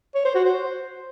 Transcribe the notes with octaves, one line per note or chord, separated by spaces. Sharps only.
C#5
C5
F#4
C5